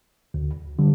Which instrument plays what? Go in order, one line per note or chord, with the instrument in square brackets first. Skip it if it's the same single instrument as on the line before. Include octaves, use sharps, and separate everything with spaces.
[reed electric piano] D2
D3 G3